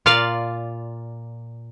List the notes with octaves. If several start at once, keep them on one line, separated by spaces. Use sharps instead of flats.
A#2 F4 D5 F5